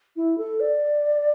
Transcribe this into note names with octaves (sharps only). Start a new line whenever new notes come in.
E4
A4
D5